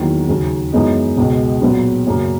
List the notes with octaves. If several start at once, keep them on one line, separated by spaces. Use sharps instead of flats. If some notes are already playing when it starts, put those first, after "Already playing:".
Already playing: E2 D#3 F#3 A#3
D#2 C#3 F#3 C#4
F#2 E3 G#3 B3 D#4
C#2 B2 G#3
A#2 F#3 B3
F#2 C#3 F#3 A#3